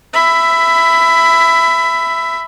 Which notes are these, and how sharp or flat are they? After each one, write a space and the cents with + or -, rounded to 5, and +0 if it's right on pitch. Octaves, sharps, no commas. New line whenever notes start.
E5 +5 B5 +20